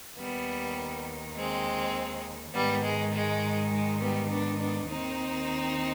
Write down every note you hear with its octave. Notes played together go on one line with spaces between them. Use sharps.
D#2 D#3 G3 B3
G#3 C4
G#2 D#3 G3 B3
G#3
G#3
G#3
G3 B3
B3 D4
B3 D4
D#2 D#3 C4 D#4